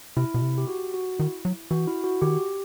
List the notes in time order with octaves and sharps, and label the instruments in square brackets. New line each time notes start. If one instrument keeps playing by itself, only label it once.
[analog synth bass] C3 [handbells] E4
[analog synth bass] B2
C3
[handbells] G4
F#4
F#4
[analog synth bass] D#3 [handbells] E4
[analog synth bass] F#3
[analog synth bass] E3 [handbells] F#4
[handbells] E4
F#4
[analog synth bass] D#3 [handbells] G4